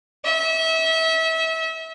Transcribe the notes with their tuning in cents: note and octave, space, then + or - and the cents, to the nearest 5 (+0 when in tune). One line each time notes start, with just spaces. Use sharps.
E5 -30